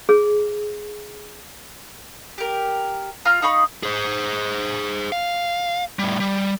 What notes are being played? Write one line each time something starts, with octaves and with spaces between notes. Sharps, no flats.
G#4
G4 A#4
F4 A#5 F6
D#4 F5 B5 C#6
G#4 C5
F5
A2 G3
G3